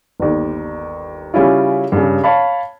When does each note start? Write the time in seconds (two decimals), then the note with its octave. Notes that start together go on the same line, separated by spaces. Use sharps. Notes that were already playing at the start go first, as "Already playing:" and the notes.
0.19 G1 D#2
1.34 C#3 G3 C#4 E4 F4
1.92 G2 C#3
2.24 C#5 F5 A5 B5